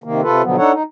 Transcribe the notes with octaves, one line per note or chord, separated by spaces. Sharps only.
C3 D#3 A#3
C3 F4 A4 B4
B2 D3 F3 F#3 B3
D4 D#4 A4 C#5 F#5
D#4